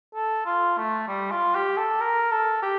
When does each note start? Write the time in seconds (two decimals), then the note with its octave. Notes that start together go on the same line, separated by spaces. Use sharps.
0.15 A4
0.46 F4
0.78 A3
1.08 G3
1.31 F4
1.55 G4
1.77 A4
2.01 A#4
2.31 A4
2.63 G4